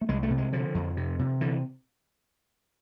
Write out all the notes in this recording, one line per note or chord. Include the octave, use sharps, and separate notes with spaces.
A3
C2 G#3
A3
C3
G#3
D3 F3
F2
C3
C3
D3 E3